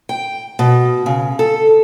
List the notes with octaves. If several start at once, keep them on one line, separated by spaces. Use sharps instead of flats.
G5
B2
C#3
A4